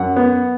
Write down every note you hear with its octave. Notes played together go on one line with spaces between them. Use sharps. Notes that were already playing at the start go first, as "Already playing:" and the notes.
Already playing: F#2 F#5
B3